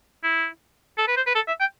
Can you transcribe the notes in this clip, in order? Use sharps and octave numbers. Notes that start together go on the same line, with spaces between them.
E4
A4
B4
C5
B4
A4
E5
G5